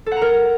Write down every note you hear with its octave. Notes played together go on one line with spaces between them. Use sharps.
A4
F#5
A#5
A#4